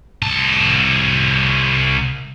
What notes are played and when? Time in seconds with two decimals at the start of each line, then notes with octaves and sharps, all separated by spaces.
0.22 C2 A5